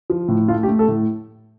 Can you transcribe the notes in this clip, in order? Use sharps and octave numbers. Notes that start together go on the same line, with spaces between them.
F3
A2
A3 F4
G4
A3
A4
A2